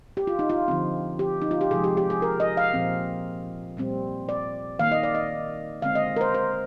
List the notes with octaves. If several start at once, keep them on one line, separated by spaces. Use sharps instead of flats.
G4
F4
D#4
F4
D3 F3 C4
G4
D#4
F4
G4
C3 F3 G#3 G#4
G4
G4
G#4
A#4
D#5
F5
A#2 F3 C4
A#2 G3 C4
D5
D#3 A#3 F5
D#5
D5
D#5
D3 G#3 C4 F5
D#5
A#4
C5
C5